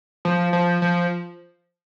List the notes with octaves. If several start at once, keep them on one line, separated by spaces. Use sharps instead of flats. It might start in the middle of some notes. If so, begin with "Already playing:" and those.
F3
F3
F3